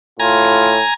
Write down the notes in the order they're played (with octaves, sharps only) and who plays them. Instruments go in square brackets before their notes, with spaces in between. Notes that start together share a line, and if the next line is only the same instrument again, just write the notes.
[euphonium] A2 [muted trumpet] F4 [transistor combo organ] G#5 A#5